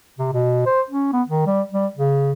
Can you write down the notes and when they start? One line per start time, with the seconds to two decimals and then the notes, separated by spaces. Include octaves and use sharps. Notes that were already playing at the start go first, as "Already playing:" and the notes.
0.19 C3
0.33 B2
0.66 C5
0.90 C#4
1.13 B3
1.28 D#3
1.46 G3
1.72 G3
1.97 C#3